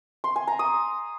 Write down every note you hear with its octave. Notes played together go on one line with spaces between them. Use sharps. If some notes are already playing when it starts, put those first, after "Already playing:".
C6
G#5
A#5
D#6